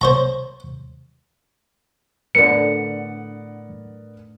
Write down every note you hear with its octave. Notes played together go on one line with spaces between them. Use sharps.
C5 C#5 A#5
A2 D3 B3 A#4 D5 C#7